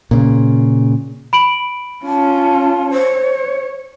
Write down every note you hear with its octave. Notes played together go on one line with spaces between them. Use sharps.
A#2 C#3
B5 D7 F#7
C#4 F4 A5
C5 C#5